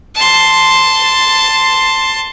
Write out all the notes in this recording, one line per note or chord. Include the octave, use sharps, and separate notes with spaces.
A5 C6